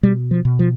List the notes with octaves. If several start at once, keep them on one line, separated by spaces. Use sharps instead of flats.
B2 G3
F3
B2
F3